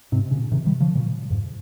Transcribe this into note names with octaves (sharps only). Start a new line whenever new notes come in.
G#2 C3
A#2 C#3
C3 D#3
D#3 G3
C#3 F3
A#2 C#3
F2 G#2